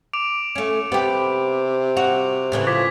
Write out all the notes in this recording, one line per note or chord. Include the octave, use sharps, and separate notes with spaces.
D6 D7 F7
A3 C#4
C3 B3 G4
F#4 F7
A2 C#3 E3
F3 D6 G#6 B6